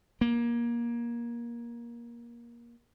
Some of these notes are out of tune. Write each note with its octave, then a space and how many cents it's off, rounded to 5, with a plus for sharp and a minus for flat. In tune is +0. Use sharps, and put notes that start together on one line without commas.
A#3 +20